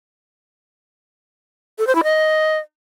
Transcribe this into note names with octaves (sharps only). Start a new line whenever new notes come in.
A4
C5
E4
D#5